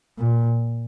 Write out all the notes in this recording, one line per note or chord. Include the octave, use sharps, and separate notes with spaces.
A#2